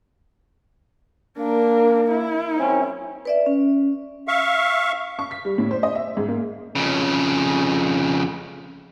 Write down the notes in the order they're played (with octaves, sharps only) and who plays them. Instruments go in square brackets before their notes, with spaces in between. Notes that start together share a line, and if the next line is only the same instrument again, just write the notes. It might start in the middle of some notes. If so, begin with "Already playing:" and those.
[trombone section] A#3 [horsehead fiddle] D4 A#4
[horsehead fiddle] E4
[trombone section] F#2 C4 C#4
[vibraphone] B4 D5 E5
C#4
[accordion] E5 F5 C#6
[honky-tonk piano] C#6
B6
G3
A2
C5
D#5
E5
G#2
A#3
[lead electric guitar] F2 C#3